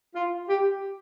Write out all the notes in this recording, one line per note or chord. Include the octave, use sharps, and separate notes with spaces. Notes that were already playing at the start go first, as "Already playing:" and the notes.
F4
G4